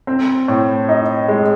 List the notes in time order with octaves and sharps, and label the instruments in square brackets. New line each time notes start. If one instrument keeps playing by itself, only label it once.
[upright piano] C4
A2
D#4
G#3